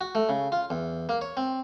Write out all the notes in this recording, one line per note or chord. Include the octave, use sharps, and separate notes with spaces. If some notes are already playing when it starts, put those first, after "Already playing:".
F#4
A3
C#3
F4
E2
A#3
C#5
C4